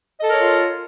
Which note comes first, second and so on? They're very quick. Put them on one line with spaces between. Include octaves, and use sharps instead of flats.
D#5 A4 A#4 C#5 F4